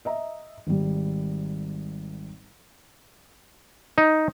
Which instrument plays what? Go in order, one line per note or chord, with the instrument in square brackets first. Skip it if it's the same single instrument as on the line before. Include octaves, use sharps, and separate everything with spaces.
[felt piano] D#5 E5 A#5
G#1 G3
[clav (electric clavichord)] D#4